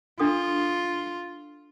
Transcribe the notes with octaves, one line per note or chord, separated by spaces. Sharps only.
D4 F4 A4 D#6